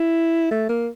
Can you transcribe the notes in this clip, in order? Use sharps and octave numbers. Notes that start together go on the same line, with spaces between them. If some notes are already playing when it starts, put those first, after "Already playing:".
Already playing: E4
A3
A#3